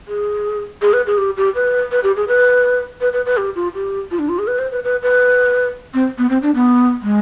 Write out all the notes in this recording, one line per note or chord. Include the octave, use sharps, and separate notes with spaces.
G#4
G#4
B4
G#4
G4
G4
B4
B4
G4
G#4
B4
B4
B4
B4
G4
F4
G4
F4
D4
F4
G#4
B4
C5
B4
B4
B4
C4
B3
C4
D4
B3
G#3